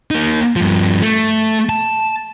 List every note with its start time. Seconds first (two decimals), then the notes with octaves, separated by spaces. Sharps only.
0.11 A#3 D#4
0.56 G2 F3
1.02 A3
1.69 A5